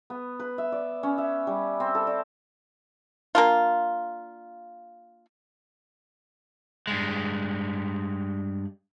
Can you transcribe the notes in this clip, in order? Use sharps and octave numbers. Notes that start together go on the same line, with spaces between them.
B3
B4
E5
D5
C#4
E5
G3
C4
A4
D5
A#3 D4 F4
G2 G#3